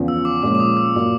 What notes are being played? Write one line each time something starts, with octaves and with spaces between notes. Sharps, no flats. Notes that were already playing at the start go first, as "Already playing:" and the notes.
Already playing: E2 C#3 F3
E6
D6
A#2 F3 G#3 C#4 D6
D6
D#6
E6
A#2 F#3